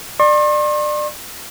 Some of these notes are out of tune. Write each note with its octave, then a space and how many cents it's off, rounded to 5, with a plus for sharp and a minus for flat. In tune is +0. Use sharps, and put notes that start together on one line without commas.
D5 +25 C6 +45